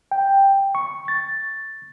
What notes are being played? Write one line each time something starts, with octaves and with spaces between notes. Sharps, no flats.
G5
C#6
A6